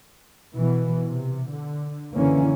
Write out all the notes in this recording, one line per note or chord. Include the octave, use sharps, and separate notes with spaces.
B2 E3
C3
D3
F#1 D3 E3 A#3 C#4